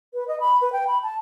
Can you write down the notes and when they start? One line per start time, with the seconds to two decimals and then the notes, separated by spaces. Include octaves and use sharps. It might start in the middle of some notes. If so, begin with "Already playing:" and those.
0.14 B4
0.28 D#5
0.40 B5
0.61 B4
0.73 G5
0.87 B5
1.03 A5